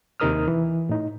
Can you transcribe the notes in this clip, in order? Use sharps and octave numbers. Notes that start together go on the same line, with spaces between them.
D#2 C3 D#4 A#4 D#6 F6
E3
A2 D#4